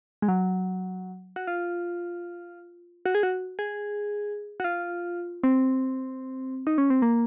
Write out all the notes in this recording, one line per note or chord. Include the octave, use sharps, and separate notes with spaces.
G#3
F#3
F#4
F4
F#4
G#4
F#4
G#4
F#4
F4
C4
D#4
C#4
C4
A#3